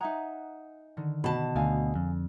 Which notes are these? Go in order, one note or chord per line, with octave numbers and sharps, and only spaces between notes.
D#4 E5 F#5 G#5 A#5 D#6
D3 D#3
B2 A5 B5
D2 D3 G#4 F5 G#5
F2